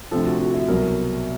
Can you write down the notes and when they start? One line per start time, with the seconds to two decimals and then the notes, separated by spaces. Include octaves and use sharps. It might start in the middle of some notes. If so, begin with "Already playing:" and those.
0.11 D2 C3 F3 A4
0.26 F#4
0.40 F#4
0.54 E4
0.68 C2 B2 F#3 A#4